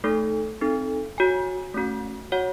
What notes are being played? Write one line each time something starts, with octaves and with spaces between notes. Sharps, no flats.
A3 D#4 A4
C4 D#4 A4
F#4 C#5 G#5
A3 C#4 F#4
F#4 C#5 F#5